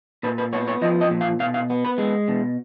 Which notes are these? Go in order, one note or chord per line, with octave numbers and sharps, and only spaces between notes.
A#2 B4
B4
B3 C#5
C#5
F3 D#5
D#5
A#2
F5
B2 F5
F5
B3
B4
G#3
B2